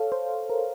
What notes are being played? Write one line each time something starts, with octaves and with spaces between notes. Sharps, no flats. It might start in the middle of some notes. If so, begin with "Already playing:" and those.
Already playing: A4 C#5 F5
C5
A#4